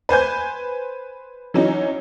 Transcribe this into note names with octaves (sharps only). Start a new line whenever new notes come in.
B4 C5 G#5 G6
E3 F#3 C#4 D#4